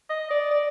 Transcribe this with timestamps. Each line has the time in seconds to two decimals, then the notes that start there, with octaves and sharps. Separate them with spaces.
0.10 D#5
0.31 D5
0.51 D5